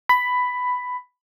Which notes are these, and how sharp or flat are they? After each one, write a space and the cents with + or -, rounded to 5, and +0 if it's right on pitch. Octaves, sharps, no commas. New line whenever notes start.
B5 +10